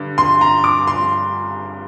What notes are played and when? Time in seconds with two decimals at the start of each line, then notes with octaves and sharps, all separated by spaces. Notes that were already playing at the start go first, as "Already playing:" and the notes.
Already playing: G2 D3
0.18 C6
0.41 A#5
0.64 D6
0.87 C6